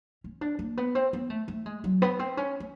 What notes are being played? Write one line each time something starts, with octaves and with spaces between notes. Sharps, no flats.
C#4
D4
A#3
B3
C4
B3
A3
A3
G#3
F#3
B3
C4
C#4
C#4